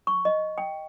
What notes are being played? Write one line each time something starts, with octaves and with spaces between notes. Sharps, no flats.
C#6
D#5
G5